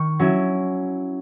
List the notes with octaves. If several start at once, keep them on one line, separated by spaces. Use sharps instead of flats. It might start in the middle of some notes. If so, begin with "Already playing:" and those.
Already playing: D#3 C#6
F#3 C#4 E4